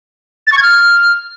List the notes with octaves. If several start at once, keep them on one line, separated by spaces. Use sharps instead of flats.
A6
C#6
G#6
F6